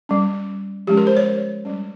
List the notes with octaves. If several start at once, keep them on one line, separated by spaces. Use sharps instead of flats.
G3 C#4
F3 G#3 C#4 G4
A#4
C5
C#5
G3 C#4